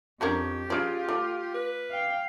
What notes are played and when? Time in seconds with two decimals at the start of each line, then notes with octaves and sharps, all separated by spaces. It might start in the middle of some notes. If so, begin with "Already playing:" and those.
0.21 F2 C#4 D4 G4 A#4 C#6 G6 G#6
0.70 C#4 F4 G#4 D5 F6 D7
1.09 A3 D6
1.54 B4
1.91 F5 G5